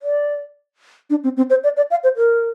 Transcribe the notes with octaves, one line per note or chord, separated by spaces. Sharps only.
D5
D4
C4
C4
C5
D5
D5
F5
C5
A#4